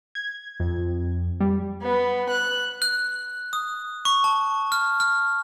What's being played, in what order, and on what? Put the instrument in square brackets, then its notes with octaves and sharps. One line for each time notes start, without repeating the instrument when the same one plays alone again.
[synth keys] G#6
F2
G3
[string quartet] B3
F#6
[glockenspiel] F#6
D#6
C#6
A5
F6
F6